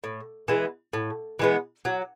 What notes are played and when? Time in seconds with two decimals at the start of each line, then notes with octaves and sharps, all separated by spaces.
0.04 A2
0.48 E3 G#3 B3
0.93 A2
1.39 E3 G#3 B3
1.85 F#3